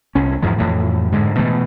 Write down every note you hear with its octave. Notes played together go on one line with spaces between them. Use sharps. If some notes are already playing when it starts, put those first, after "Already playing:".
C2 C#4
E2 G#2 F3 G#3
F2 A2 E3
G#2 D3 G#3
B2 E3 A3